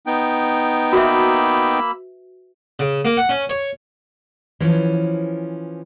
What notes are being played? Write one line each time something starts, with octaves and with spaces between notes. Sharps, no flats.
B3 D#4 G5
A#3 F#4 B4 E5 B5 E6
C#3
A#3
F#5
C#4
C#5
E3 F3 C#4